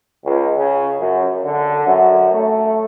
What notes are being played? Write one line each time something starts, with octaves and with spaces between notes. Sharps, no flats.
C#2
C#3
F#2
D3
F#2
A3